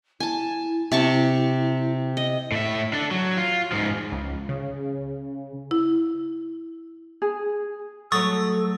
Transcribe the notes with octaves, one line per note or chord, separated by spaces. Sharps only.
E4 G#5 A5
C3 A5 C#6
D#5
A2 E5
D4 A4
F#3
F4
G#2 F3
C#2
C#3
E4
G#4
F#3 A3 A4 C#5 C#6 D#6 A6